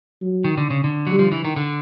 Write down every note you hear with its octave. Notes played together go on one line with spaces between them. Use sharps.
F#3
D#3
D3
C#3
D3
F#3
G3
F3
E3
D#3
D3